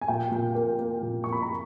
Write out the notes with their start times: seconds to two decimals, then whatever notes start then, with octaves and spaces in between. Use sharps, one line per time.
0.01 G#5
0.08 A#2 G5
0.31 A#2
0.55 A#3
0.79 A#3
1.03 A#2
1.24 A#2 C#6
1.32 B5
1.42 A#5